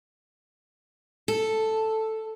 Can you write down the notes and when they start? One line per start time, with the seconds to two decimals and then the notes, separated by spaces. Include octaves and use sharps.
1.28 A4